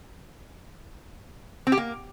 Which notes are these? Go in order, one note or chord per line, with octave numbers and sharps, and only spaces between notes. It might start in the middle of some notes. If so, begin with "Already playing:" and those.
C4
G4
A#3